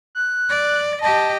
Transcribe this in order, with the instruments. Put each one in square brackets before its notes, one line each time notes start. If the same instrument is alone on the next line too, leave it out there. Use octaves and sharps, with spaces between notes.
[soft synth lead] F#6
[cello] D5
[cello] G4 D#5 [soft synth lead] A5